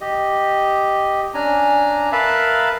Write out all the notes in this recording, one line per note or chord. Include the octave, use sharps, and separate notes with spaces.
G4 D#5
C#4 D4 G#5 A#5
A#4 B4 E5 F5 A5 B5